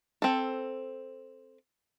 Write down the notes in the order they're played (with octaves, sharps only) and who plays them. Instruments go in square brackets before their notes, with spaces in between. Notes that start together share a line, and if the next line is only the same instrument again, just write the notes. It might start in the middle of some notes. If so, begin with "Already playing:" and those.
[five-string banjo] C4 A4